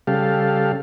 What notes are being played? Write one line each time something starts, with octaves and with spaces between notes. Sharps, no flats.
C#3 G3 G4 A4 F5